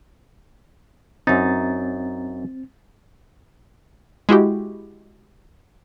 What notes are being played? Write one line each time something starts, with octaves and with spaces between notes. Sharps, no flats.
F#2 C4 D#4 A6
G#3 E4 F#4 G4